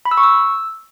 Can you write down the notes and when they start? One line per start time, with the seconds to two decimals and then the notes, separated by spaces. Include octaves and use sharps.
0.05 B5
0.11 E6
0.17 C#6
0.23 E6